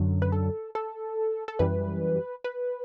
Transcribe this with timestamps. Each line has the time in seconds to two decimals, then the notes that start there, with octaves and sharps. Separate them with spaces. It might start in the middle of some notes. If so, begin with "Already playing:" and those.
Already playing: F#2 D3 F#3
0.22 B4
0.32 A4
0.75 A4
1.48 A4
1.59 F#2 E3 G3 B4
2.44 B4